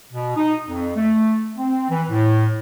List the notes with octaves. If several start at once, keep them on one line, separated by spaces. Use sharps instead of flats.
B2
D#4
F2
A3
C4
E3
A2